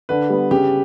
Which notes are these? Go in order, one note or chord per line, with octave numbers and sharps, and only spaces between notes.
D3 B4
G3 B3
C#3 G4